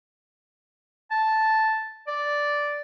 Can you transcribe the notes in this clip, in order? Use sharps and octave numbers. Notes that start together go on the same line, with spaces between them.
A5
D5